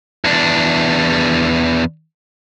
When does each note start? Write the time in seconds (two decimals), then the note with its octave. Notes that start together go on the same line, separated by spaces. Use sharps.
0.25 E2 D4